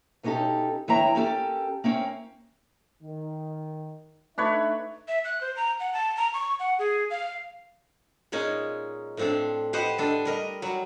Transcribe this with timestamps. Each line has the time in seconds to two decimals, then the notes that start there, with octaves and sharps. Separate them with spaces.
0.23 B2 B3 C#4 D#4 G4 A4
0.88 D2 E3 A#3 C#5 G5 A#5
1.15 A#3 C#4 G4 A4
1.84 A#3 C4 C#4
3.02 D#3
4.38 A3 D4 D#4 B4 C#5 E5
5.08 E5
5.25 F#6
5.41 C5
5.56 A#5
5.80 F#5
5.93 A5
6.17 A#5
6.34 C#6
6.60 F#5
6.79 G#4
7.10 F5
8.32 A#2 G#3 C#4 D#4
9.17 A2 F3 C4 D4 A4
9.73 G4 B4 C5 D#5 F#5
9.98 D4 A4 D#5
10.25 G3 A#4 D#5
10.62 F#3 G3